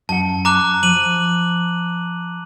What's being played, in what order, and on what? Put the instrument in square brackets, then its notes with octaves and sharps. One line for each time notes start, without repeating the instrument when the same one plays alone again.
[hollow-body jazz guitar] F#2 F#5 [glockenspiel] A5
[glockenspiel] A#5 D6 F#6
[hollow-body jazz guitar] F3 [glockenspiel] D#7 F#7